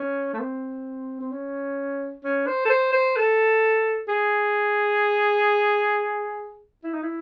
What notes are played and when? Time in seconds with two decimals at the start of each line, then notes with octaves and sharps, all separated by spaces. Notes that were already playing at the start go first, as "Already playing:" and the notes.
Already playing: C#4
0.34 A3
0.40 C4
1.21 C4
1.32 C#4
2.24 C#4
2.47 C5
2.65 A4
2.70 C5
2.93 C5
3.16 A4
4.08 G#4
6.84 E4
6.94 D#4
7.03 E4